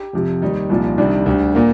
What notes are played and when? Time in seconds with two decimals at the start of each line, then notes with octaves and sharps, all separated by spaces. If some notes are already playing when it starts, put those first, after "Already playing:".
Already playing: G4
0.13 F2 C3 F3
0.42 D#2 D#3 G3 D#4
0.69 C2 A#2 F3
0.98 C2 C3 D#3 G3 D4
1.26 D2 D3 G3
1.55 A#2 A#3